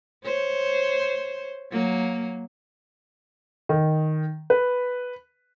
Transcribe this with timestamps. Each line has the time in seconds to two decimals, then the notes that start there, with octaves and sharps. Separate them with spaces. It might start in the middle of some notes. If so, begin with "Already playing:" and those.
0.25 C5 C#5
1.71 F#3 A#3
3.69 D#3
4.50 B4